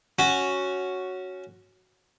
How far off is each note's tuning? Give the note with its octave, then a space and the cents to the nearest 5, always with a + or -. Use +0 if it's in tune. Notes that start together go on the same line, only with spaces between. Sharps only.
C#4 +0 F#4 +0